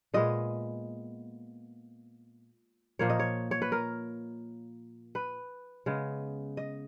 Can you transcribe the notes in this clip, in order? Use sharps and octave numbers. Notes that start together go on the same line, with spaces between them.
A#2 G#3 B3 D#5
A#2 F3 A#3 C#5
D#5
C#5
C#5
B4
A#4
B4
C#3 G#3 B3
D#5